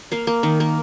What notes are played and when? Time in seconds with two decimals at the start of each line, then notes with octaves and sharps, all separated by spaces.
0.12 A#3 F5
0.27 A#3
0.43 D#3
0.60 A#3